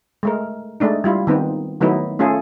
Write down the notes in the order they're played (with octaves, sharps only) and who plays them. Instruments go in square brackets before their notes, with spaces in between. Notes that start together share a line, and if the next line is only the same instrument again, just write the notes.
[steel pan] G#3 A3 A#4
G#3 A3 D4 D#4
G3 E4 F4
D#3 B3 C4 D#4
D#3 F#3 A3 B3 D#4 E4
A3 C#4 F4 G#4 A4